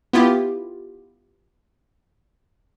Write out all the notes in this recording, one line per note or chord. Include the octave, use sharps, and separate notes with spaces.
B3 E4 F4 G4